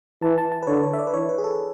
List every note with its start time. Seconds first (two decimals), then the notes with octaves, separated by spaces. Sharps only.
0.22 E3 A5
0.38 A5
0.52 A5
0.63 B4
0.67 D3 C#5
0.83 C#5
0.93 E5
0.99 D5
1.07 B4
1.13 E3 C#5
1.29 B4
1.38 G#4
1.44 A4